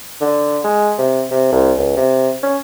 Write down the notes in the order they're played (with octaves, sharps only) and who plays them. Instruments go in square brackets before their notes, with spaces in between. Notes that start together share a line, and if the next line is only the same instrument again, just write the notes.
[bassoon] D3
G#3
C3
C3
C2
C#2
C3
C#4